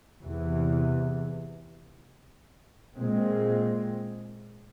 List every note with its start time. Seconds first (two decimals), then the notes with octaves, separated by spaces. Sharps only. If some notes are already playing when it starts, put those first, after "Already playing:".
0.23 E2 C3 E3
2.96 A#2 G#3 C4